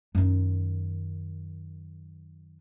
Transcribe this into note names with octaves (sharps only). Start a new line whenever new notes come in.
F#2 D#3